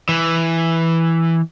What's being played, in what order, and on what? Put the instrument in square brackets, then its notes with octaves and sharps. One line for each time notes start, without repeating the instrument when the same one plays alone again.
[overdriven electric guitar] E3